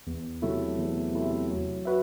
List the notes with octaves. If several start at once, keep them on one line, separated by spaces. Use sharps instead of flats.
E2
C3 F#3 A3 E4
E2
C3 F#3 A3 E4
F#3
F#4 B4 E5